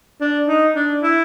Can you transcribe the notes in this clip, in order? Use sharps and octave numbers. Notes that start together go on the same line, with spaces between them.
D4
D#4
D4
E4